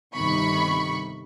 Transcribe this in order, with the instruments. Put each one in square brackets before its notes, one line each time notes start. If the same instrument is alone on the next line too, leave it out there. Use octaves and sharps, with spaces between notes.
[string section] G1 C3 D#3 B5 C#6